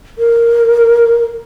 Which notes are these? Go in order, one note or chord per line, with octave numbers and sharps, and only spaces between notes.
A#4